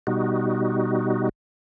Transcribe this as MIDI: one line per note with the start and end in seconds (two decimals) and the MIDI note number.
0.07 1.29 47
0.07 1.29 55
0.07 1.29 63
0.07 1.29 66